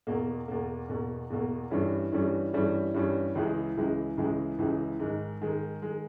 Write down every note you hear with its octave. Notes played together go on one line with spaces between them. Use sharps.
E2 B2 A#3
E2 B2 A#3
E2 B2 A#3
E2 B2 A#3
G2 E3 G3 C#4
G2 E3 G3 C#4
G2 E3 G3 C#4
G2 E3 G3 C#4
C#2 C#3 E3 G#3
C#2 C#3 E3 G#3
C#2 C#3 E3 G#3
C#2 C#3 E3 G#3
G#2 D#3 G#3
G#2 D#3 G#3
D#3 G#3